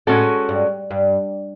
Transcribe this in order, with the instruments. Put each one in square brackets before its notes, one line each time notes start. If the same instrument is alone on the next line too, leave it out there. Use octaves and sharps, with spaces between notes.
[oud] A2 [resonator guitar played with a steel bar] G#3 C#4 F#4 A4
[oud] G2
G2